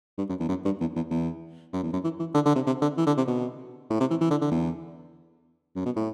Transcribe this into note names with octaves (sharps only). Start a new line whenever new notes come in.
G2
F#2
E2
F#2
G2
E2
E2
E2
F#2
E2
F#2
E3
E3
D3
D3
C3
C3
D3
E3
D3
C3
B2
A2
C3
E3
E3
D3
D3
E2
F#2
B2
A2